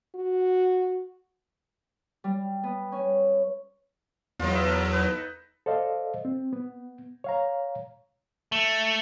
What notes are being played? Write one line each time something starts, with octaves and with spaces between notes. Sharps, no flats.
F#4
G3
B3
C#4
E2 F#3 F4 A#4 D#5
B3 D#5 E5
A4 A#4
D#4 B4
A4 C5 D5 D#5 F5
C4
B3
C#5 F5 A#5
A3